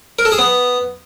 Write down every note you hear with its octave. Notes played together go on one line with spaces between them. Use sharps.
A#4
A4
G#4
B3